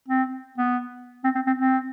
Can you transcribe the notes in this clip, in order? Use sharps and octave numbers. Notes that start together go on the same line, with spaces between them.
C4
B3
C4
C4
C4
C4